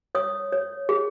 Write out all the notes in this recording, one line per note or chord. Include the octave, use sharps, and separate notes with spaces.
C#5 D#6
C#5
G#4